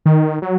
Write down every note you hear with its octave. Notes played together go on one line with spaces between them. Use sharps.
D#3
F#3